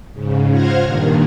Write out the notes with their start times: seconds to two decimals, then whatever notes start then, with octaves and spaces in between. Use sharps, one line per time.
0.13 G#2 C#3
0.50 F4 C5 F#5 F6 G#6 A#6
0.82 G2 A#2 D#3